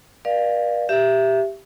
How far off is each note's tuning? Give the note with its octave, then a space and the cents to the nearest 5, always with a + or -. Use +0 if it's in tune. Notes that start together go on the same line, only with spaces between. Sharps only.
B4 -45 D5 +30 F5 +0
G4 +0 E5 +15